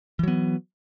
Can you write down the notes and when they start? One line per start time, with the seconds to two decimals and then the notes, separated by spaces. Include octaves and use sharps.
0.19 E3
0.23 F#3
0.28 B3